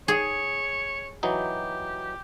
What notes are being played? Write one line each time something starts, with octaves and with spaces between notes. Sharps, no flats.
G#4 C#5
E3 F#3 D#4 G4